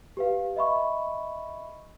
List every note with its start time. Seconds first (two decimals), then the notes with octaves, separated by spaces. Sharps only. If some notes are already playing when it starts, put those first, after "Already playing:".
0.17 G4 B4 F5
0.56 D#5 E5 B5 C#6